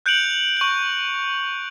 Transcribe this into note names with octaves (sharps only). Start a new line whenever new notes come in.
F#6 G6 C#7 D7 F7 F#7
C#6 F#7